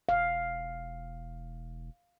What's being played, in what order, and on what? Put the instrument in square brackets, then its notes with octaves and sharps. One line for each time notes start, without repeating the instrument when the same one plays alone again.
[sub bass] E1 [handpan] F5